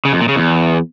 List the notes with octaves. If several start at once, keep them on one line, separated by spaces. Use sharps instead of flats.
C#3
F2
A#2
C#3
E2